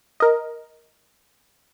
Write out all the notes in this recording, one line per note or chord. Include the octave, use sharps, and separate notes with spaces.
A#4 D#5